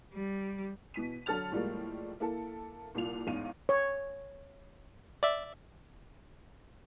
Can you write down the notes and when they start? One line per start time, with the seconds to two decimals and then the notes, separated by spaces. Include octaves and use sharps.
0.14 G3
0.94 B2 E3 B6 D#7
1.26 D3 F#3 A4 F6 A6 F7
1.52 A2 F3 G3 G#3 A#3
2.20 A#3 E4 A4
2.95 C2 A#2 F4 F7
3.27 A1 E2 G#2 F5 D#7
3.69 C#5
5.23 D5 E5